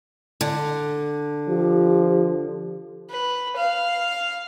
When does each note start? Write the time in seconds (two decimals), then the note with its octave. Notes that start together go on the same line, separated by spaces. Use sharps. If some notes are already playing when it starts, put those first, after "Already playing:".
0.41 D3
1.48 F3 G4
3.10 B4
3.56 F5